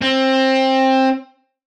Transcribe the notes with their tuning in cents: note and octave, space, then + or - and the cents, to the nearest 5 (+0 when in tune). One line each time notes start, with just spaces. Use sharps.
C4 +20